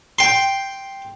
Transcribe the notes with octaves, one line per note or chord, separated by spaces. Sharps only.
G5 C6